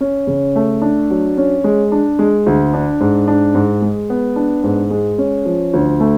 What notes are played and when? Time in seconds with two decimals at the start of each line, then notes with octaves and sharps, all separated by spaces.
0.01 C#4
0.27 C#3
0.56 A3
0.82 D4
1.10 F#3
1.37 C#4
1.64 G#3
1.92 D4
2.19 G#3
2.46 D2
2.74 D4
3.00 G#2
3.28 D4
3.55 G#2
3.82 G#3
4.10 B3
4.36 D4
4.63 G#2
4.90 G#3
5.18 C#4
5.45 F3
5.73 D2
6.00 A3